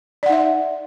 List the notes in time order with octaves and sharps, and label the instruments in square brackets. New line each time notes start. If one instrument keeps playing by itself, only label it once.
[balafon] D5
F#5
D#4
E5